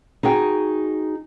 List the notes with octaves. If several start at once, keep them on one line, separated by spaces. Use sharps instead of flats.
D#4 F#4 G#4 G5